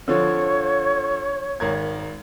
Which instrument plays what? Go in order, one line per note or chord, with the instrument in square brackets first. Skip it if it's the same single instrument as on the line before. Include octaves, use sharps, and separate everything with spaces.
[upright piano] D3 F3 [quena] C#5
[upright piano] G#1 A#4 G#6